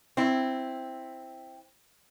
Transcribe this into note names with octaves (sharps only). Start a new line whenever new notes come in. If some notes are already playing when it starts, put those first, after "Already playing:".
C4 E4